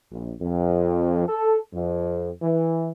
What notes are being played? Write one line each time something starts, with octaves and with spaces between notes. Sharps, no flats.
A#1
F2
A4
F2
E3